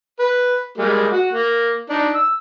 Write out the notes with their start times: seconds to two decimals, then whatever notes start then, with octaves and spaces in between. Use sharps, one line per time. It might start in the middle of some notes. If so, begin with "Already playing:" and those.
0.19 B4
0.78 G3 G#3 A#3
1.12 F#4
1.33 A#3
1.89 D4 D#4
2.15 E6